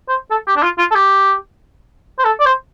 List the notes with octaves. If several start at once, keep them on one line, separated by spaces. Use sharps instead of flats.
C5
A4
G4
D4
F4
F4
A4
G4
C5
A4
D5
C5